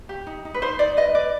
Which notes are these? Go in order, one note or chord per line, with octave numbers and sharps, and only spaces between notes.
G4
D#4
D#4
B4
D#4 C5
D#4 D5
B4 D#5
B4 D5